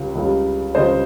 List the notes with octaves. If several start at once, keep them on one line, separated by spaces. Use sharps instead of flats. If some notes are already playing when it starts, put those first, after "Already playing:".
Already playing: C#2 C#3 G3
C#2 C#3 G3
C#2 C#3 G3 C5 D#5